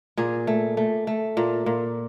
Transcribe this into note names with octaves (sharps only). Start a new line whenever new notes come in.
A#2 G#4
A3
A3
A3
A#2
A#2